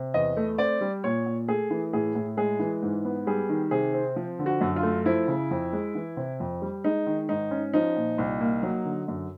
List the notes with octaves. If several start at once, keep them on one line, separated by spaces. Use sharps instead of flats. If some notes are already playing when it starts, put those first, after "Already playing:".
Already playing: C3
E2 D#5
A3
C4 D5
G3
A#2 C#5
A#2
A3 G#4
E3
A2 G#4
A2
G#3 G#4
E3
G#2
B3
G3 G#4
D#3
C3 G#4
C4
F3
D3
F#4
F#2
F4
A3
F3 E4
C#3
F2
G#3
E3
C3
F2
G3
G#3 D#4
D#3
G#2 D#4
C#4
F3 D#4
A#2
C2
A#3
F#3
D3
F#2